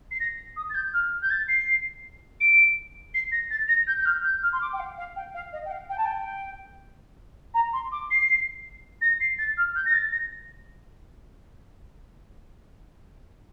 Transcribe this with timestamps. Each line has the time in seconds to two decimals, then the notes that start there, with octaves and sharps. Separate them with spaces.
0.11 C7
0.20 A#6
0.56 D#6
0.69 A6
0.74 G6
0.93 F6
1.21 G6
1.30 A6
1.48 C7
2.40 D7
3.14 C7
3.31 A#6
3.50 A6
3.68 A#6
3.87 G6
3.99 G6
4.05 F6
4.24 G6
4.42 F6
4.52 C6
4.61 D6
4.73 G5
4.79 F5
4.97 F5
5.16 G5
5.34 F5
5.52 D#5
5.65 G5
5.71 F5
5.89 G5
5.97 A5
6.05 G5
7.54 A#5
7.73 C6
7.91 D6
8.10 C7
9.01 A#6
9.20 C7
9.38 A6
9.57 F6
9.75 G6
9.85 A#6
9.93 A6
10.12 A#6